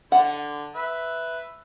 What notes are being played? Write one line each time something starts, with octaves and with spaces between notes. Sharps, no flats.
D3 F#5
B4 E5